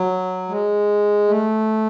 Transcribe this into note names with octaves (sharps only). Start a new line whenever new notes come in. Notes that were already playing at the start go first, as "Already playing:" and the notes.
Already playing: F#3
G#3
A3